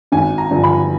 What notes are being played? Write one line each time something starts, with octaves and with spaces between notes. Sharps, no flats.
G#1 G#5
A#5
G2 D3 F3
B5